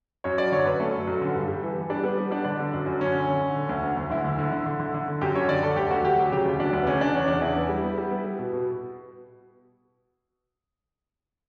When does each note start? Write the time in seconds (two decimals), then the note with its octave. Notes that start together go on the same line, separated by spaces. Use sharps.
0.24 F#2 C#5
0.38 F#3 D5
0.52 D3 C#5
0.66 F#2 B4
0.80 A3 A4
0.93 F#3
1.07 F#2
1.22 D3
1.35 G2
1.48 G3
1.63 E3
1.77 B3
1.90 G3 D4
2.03 G3 B3
2.18 G3 B3
2.31 G3 D4
2.45 D3 D4
2.59 D3
2.73 F#2
2.86 F#2
3.00 D3 C#4
3.15 D3
3.28 D3
3.41 D3
3.56 D3
3.69 D2
3.83 D2
3.97 D2
4.10 D3 E4
4.24 D2
4.38 D3
4.52 D3
4.66 D3
4.79 D3
4.94 D3
5.08 D3
5.21 F#2 G4
5.34 D3 C#5
5.48 D3 D5
5.63 D3 A4
5.76 D2 G4
5.90 D2 F#4
6.03 D2 G4
6.18 F#3
6.31 C#3 G4
6.45 D2
6.60 F#3 D4
6.73 D2
6.82 B3
6.87 C#3 C#4
7.01 E2 D4
7.14 E2 C#4
7.28 C#3 D4
7.41 E2 E4
7.56 B3
7.69 G3
7.83 B3
7.98 G3
8.10 B3
8.24 G3
8.39 B2
8.53 B2